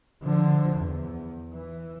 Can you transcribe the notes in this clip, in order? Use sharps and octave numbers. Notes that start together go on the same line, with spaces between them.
D3 F3
E2
E3